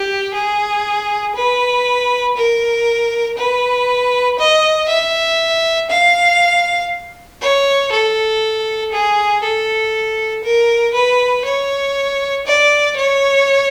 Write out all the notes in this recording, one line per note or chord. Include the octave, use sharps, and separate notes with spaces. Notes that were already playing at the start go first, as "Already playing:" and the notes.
Already playing: G4
G#4
B4
A#4
B4
D#5
E5
F5
C#5
A4
G#4
A4
A#4
B4
C#5
D5
C#5